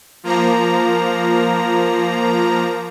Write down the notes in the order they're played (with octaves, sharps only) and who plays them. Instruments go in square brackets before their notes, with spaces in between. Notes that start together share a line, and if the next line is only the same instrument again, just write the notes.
[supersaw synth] F3 A#3 A#5